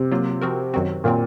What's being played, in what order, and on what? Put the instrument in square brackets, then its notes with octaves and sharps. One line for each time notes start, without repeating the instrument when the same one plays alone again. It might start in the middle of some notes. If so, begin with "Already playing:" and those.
Already playing: [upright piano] C3
[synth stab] F#3 A#3 F4
F3 C4 F#4 A#4
F#2 D#3 F#3 C4 F#4
[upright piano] A#2 [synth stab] D#3 F#3 C4